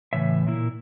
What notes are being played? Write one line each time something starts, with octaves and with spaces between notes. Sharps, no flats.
A2 C#3 E3 C#5 E5
A#2 A#3 E4